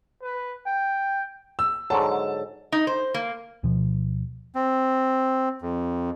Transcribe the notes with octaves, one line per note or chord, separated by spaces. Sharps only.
B4
G5
E6
G#2 D3 F#3 A5
D#4
C5
A#3
D2 B2 F3
C4
F2